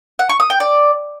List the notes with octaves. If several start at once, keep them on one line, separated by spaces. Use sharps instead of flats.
F#5
C#6
D#6
G5
D5